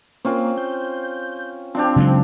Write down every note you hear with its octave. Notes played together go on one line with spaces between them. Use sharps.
A#3 C4 C#4 F4
G6
F3 C4 D4 G4
C#3 F#3 G#3